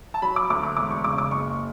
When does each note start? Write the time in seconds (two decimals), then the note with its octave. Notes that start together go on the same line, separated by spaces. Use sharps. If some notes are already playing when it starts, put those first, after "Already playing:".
0.14 A5
0.22 F#3 B5
0.36 D6
0.50 D2 D6
0.63 D6
0.77 E1 D6
0.91 C#6
1.04 C#3 D6
1.18 D6
1.31 F#1 C#6